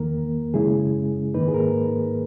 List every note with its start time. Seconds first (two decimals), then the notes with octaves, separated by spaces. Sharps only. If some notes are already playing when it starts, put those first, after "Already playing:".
Already playing: E2 D#3 A#3 A#4
0.54 F#2 C#3 G#3 C#4 E4 G#4
1.34 G#2 D#3 A#3 D#4 B4
1.48 G#4
1.54 A#4